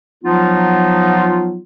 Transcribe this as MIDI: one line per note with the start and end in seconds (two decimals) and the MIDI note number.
0.24 1.59 53
0.24 1.59 54
0.24 1.59 59
0.24 1.59 63
0.24 1.59 65